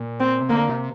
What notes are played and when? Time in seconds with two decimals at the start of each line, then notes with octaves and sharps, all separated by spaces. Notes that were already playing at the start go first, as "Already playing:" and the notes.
Already playing: A#2
0.20 C4
0.41 C3
0.49 D3 A#3
0.69 C3